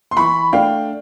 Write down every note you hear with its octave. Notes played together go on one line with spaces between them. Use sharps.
C6
E3 B5 C#6
A3 D4 F5 G5